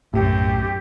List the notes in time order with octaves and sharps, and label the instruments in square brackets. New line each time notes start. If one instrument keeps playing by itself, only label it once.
[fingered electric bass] B1 A2 [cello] F#2 [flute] G4